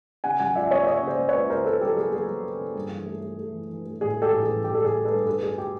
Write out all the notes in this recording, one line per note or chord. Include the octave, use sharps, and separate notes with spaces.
C#3 F#5 G#5
F#3 F#5 G#5
C#2 D5 E5
A#3 C#5 D#5
E5
C#3 C#5 D#5
C#3
C5 D5
A#3
B4 C#5
C#2
C#2 A#4 C5
C#2 A4 B4
F#3 G4 A4
A#3 G#4
F#3 G#4
F#3
C#3
A#3
G2
E3
A3
A3
A3
E3
E3
A3
A1 G#4
A3
G4 A4
A1
G#4
A1
A1 G4
A1 A4
G#4
A3
A4 B4
G2
D2 A4 B4
D2 G#4
G4